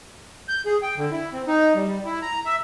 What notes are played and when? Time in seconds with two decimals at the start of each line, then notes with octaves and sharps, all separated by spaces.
0.48 G6
0.66 G#4
0.82 G5
0.97 D3
1.12 E4
1.33 C4
1.47 D#4
1.75 G3
1.88 G3
2.05 E4
2.22 A#5
2.46 E5